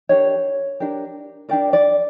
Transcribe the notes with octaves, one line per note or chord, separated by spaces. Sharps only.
D4 G4 A#4 C#5
D4 G4 A#4
D4 G4 A#4 D5
D5